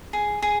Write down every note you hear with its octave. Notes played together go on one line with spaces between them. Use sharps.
G#4
G#4